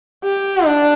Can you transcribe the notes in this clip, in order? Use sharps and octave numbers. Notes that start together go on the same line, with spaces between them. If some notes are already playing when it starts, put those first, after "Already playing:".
G4
D4